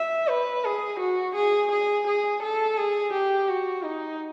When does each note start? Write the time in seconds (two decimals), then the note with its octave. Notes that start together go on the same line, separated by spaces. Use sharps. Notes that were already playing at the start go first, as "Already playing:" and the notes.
Already playing: E5
0.29 B4
0.64 G#4
1.00 F#4
1.35 G#4
1.71 G#4
2.07 G#4
2.43 A4
2.77 G#4
3.13 G4
3.49 F#4
3.84 D#4